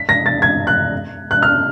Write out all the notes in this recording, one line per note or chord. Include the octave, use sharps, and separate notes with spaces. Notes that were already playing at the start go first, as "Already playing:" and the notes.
Already playing: B6
A#6
A6
G#6
F#6
F#6
F6